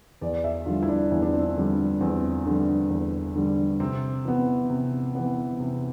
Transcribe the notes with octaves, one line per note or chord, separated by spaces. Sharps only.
E2 D5
E5
D3 G3 F4
E4
D4
E2 E4
D4
C4
D4
D3 G3
E2 C4
D3 G3
E2
D3 G3
C3 C4
E3 B3
C3
E3 B3
C3